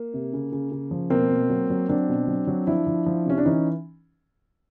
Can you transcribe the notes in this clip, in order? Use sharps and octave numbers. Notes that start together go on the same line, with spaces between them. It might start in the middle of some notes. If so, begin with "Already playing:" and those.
Already playing: A#3
C3
C#3
C#3
C#3
F3
B2 A#3 C4
B2
F#3
F#3
F#3 C4 D4
B2
F#3
F#3
F3 D4 E4
F3
F3
C3 C#4
D4
E3 C#4 D#4